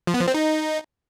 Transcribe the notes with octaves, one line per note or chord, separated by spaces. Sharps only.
F3
B3
F3
C4
D#4